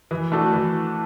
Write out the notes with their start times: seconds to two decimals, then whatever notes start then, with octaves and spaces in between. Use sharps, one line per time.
0.11 E3
0.32 A3 D4 F#4 A4
0.53 E3